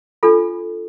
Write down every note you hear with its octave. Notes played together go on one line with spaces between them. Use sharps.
D4 F4 A4